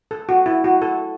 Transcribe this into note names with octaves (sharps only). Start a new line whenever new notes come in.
A4
F#4
E4
F#4
A4